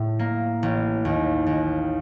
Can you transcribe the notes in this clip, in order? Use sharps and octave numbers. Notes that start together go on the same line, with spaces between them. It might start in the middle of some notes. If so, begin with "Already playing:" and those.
Already playing: A2
A#3
A1
D#2
D#2